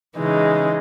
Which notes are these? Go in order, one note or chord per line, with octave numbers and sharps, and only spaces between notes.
C#3 E3 G#3 D#4